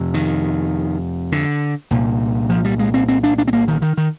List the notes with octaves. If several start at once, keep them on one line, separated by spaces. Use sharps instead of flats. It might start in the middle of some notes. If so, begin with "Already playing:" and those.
Already playing: F2 C3
D#3
D3
C2 A#2
F3
G3
G#3
C4
C4
D4
D4
C4
A#3
D#3
D#3
D#3